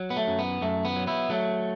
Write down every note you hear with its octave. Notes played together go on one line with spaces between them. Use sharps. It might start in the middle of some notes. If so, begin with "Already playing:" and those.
Already playing: F#3
B3
A3
F#2
B3
F#2 A3
B3
F#3
B3 E4
F#3 A3